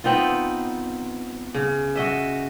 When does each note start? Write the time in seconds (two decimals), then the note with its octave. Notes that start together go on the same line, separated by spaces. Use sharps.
0.04 B3 C4 D#4 F4
1.55 C#3
1.96 F#4 D#5 E5